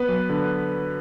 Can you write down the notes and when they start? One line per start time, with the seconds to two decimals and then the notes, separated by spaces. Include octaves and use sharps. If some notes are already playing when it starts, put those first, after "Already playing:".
Already playing: B3 B4
0.09 F#3
0.29 D3